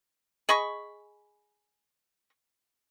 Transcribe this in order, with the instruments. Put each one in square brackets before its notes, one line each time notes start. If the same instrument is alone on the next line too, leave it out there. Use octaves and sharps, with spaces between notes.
[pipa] G#4 D#5 B5 C#6